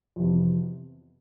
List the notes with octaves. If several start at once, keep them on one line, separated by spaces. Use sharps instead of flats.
F2 C3 E3 B3